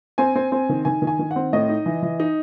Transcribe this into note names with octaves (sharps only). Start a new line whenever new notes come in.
C4 G#5
C4
C4
D#3
D#3 G#5
D#3
G#5
D#3
F#5
C4
A2 D#5
D#4
E3
E3
D#4